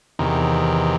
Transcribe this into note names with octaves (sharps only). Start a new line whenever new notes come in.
E2 C3 D#3